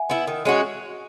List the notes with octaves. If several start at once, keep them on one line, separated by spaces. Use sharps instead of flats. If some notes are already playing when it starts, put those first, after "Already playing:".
Already playing: E5 F#5 G#5
B3 E4
D#3
G#3 C#4 F#4